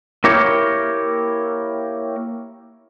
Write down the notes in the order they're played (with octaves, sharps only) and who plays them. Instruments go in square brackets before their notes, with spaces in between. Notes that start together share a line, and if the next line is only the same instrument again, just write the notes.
[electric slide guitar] A#3 E4 G4 A#4 C#5